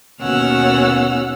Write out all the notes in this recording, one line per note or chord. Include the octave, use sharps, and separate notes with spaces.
D#2 B2 C#4 F#5 E6 F6